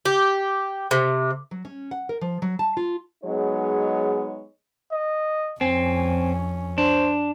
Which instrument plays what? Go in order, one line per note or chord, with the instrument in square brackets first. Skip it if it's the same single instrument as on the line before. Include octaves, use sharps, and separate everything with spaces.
[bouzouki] G4
C3
[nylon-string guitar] F#3
C#4
F#5
A#4
F3
F#3
A5
F4
[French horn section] F#3 G#3 B3 D#4 G#4 C#5
[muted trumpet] D#5
[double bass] F2 C#4 [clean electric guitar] C4 [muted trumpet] G#5
[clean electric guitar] D4 [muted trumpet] C5